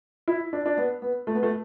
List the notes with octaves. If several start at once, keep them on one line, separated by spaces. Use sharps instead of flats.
E4
D4
D4
B3
B3
A3
B3
A3